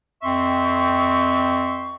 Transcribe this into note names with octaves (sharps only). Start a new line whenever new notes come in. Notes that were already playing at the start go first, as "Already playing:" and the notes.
F2 C4 E5 C6 C#6